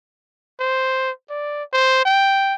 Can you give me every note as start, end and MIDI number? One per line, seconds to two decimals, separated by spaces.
0.60 1.11 72
1.30 1.63 74
1.73 2.05 72
2.05 2.55 79